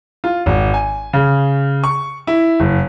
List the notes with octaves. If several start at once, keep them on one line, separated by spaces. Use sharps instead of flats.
F4
G#1
G#5
C#3
C#6
E4
F#1